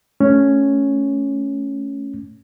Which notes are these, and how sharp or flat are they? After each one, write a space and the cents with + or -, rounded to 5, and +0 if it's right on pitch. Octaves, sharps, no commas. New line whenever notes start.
A3 +0 C#4 +0